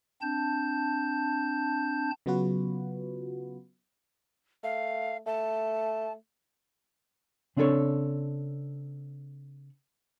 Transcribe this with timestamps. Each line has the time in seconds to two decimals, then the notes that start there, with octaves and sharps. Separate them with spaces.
0.22 C4 D4 A5 G6
2.26 C#3 F#3 B3 F4 F#4 B4
4.63 A3 F5
5.26 A3 A5
7.57 C#3 C4 D4 F4 A4 C#5